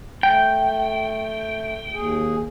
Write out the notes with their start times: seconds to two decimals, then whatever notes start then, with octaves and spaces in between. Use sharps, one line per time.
0.23 A3 G5
1.93 D#2 G#4